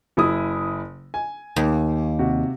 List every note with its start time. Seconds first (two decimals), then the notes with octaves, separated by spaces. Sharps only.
0.17 F#1 E4 D#6
1.14 G#5
1.56 D#2
2.19 C3 F#4